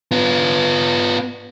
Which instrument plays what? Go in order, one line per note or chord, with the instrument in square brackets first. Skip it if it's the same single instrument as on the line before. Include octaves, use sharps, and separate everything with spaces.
[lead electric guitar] B3 F4